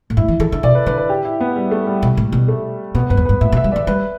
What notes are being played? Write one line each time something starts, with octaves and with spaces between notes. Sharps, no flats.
A2
G2 E4
E3
E3 A4
D3
B2 D5
B4
D3 B4
B4
G4
E4
B3
G3
A3
G3
B2
A2
B2
A3
B2 B3
G2 B4
E2
G2 B4
A2 E5
B2
E5
G3
E3 D5
G3 B4